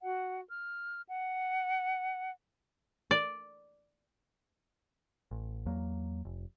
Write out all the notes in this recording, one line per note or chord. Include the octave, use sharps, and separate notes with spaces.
F#4 F#5
F6
F#5
D5
A1
E2 F#3 A#3
F1